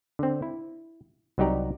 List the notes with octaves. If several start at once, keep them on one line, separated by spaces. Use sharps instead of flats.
D3 C4
E4
C2 F#3 D#4 G4 D5 A#5